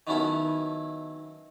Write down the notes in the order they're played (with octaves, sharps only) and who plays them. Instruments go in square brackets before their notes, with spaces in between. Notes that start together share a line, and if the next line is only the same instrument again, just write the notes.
[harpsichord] D#3 F#3 B3 C#4 E4 A4